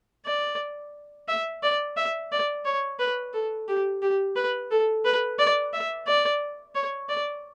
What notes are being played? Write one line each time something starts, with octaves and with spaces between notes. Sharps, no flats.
D5
E5
D5
E5
D5
C#5
B4
A4
G4
G4
B4
A4
B4
D5
E5
D5
C#5
D5